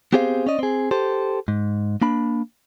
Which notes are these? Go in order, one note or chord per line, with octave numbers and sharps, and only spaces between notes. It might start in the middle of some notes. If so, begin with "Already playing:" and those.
B3 C4 G4 G#4 C5 F5
C#4 D5 D#5
C4 G#4
G4 A4 C5
G#2
A#3 D4 B5